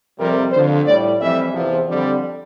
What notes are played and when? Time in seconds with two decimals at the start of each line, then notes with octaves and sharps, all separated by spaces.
0.19 F2 C3 G3 A#4
0.53 F2 D3 F3 C5
0.86 A2 G3 D5
1.20 F2 E3 G3 E5
1.53 E2 C3 F3
1.87 F2 D3 G3 D5